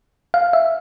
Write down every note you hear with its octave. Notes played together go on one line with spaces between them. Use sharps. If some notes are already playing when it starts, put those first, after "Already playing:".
F5
E5